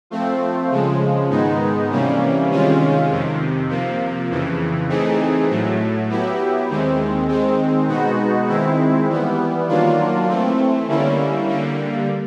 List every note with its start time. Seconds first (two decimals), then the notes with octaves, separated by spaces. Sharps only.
0.10 F3 A3 C4
0.70 C#3 F3 G#3
1.30 G#2 D#3 G#3 B3 D#4
1.90 C3 E3 G3 A#3 C#4
2.50 C3 D#3 G#3 C#4 F4
3.10 F2 C3 D#3
3.69 C3 F3 A#3
4.29 F2 C#3 E3
4.89 E3 A3 C4 D#4 G#4
5.49 A2 F#3 A3
6.09 F#3 B3 E4 G4
6.69 D#2 D#3 G#3 C4
7.28 D#3 G#3 C4
7.88 B2 G#3 B3 D#4 F#4
8.48 D#3 G#3 C4 E4
9.09 E3 G3 B3
9.68 D#3 F#3 A#3 D4 F4
10.28 E3 A3 C4
10.88 D3 G3 A#3 C#4 E4
11.48 D3 G3 A#3